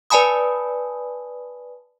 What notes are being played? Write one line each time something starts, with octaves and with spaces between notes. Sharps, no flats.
B4 D5 G#5 A5 B5 D#6